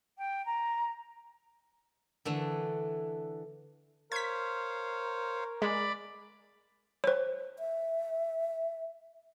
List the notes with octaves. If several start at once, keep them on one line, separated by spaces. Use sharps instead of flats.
G5
A#5
D3 E3 A3
A#4 C5 C#5 F5 G#6 B6
G#3 D5 B5
C5 C#5
E5